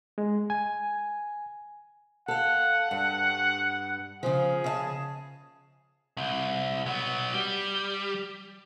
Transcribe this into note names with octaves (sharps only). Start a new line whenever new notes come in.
G#3
G#5
A4 F5 F#5
G2
C#3 F3 G#4
C#3 E5 A5
C2
F#3 B3
G3